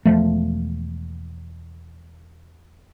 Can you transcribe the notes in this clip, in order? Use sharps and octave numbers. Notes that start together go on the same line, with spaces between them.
E1 C#2 F3 A3